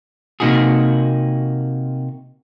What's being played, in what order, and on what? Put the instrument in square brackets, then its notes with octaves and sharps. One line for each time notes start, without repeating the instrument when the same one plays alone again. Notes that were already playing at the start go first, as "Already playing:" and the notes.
[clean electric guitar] C3 A#3 D#4 F#4 G#4